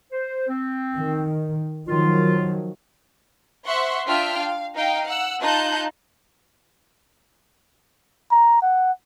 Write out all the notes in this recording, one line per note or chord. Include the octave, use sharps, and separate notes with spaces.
C5
C4
D#3
D#3 F3 F#3 F4
C5 E5 F#5 C6 C#6
D4 F4 E5 G5 F6
F5
D#4 F5 G5
F#5 E6
D#4 F4 A5 F#6 G6
A#5
F#5